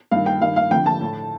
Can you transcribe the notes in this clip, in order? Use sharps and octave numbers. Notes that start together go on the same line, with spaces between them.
G2 D#3 F5
G5
G2 D#3 F5
F5
F2 D3 G5
A5
A2